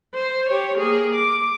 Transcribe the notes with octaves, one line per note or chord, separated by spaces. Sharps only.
C5
G4 C#5
A#3 G#4
D6